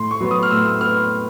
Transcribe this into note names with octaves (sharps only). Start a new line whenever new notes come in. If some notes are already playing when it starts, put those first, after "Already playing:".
Already playing: A2 C6
C#6
F#3 B3
D#6
F6
A2 E6
E6
B3 F6